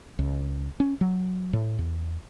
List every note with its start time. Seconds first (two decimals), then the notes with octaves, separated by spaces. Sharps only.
0.19 C#2
0.80 C#4
1.01 F#3
1.53 A2
1.79 E2